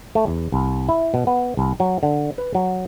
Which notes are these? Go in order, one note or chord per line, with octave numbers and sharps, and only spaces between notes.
A3
E2
C2
E4
B2
B3
C2
F#3
D3
B4
F#3